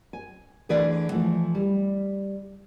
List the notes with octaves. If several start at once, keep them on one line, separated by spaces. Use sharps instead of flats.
G#5
D2 D3 E3 G#4 B4 D5
E3 F3 A3
G3